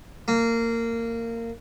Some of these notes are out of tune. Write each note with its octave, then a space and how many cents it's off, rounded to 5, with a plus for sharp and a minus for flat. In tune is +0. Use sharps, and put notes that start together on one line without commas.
A#3 -20